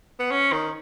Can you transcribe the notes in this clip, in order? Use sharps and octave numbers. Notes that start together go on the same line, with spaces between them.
B3
C#4
D#3